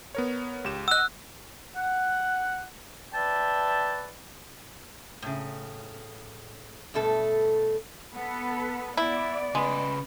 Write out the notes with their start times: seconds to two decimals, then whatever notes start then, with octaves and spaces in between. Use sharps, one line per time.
0.15 B3 A#4 C#5
0.64 C#2 G4 E7
0.88 D#5 F#5 E6 F#6
1.76 F#5
3.14 B4 D5 E5 G5 A5
5.22 A2 C#3
6.94 G2 B2 A3 A4
8.14 B3 A4 B4
8.97 B3 E4 D5
9.55 C#3 G#3 B4